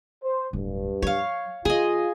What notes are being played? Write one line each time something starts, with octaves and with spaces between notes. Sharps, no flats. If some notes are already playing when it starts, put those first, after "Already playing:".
C5
D1 G2
F3 C#5 F5
E3 F4 G#4 D#5